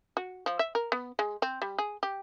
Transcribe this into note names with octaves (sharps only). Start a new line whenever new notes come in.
F#4
F3
E5
A#4
B3
G#3
C4
G3
G#4
G4